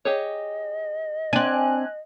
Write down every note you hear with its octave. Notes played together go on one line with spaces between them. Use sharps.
G4 G#4 C#5 D#5
C4 D4 G#5 F#6